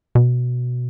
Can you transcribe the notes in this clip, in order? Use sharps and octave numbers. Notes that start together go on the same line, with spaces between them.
B2